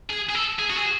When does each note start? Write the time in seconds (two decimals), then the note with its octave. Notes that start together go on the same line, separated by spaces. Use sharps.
0.10 G#4
0.30 G#4
0.35 A4
0.59 G#4
0.70 F#4
0.76 G#4